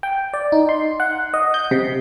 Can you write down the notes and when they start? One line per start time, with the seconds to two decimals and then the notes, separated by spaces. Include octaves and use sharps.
0.03 G5
0.34 D5
0.52 D#4
0.69 C6
1.00 F#5
1.34 D#5
1.54 G6
1.71 C3